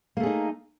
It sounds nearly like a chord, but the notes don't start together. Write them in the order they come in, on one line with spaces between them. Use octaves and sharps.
A#3 A3 G#4 D#4